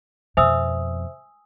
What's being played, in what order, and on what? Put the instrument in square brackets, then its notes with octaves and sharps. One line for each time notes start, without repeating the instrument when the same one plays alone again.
[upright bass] F2 B2 [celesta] C5 E5 F7 [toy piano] G#5 D#6 E6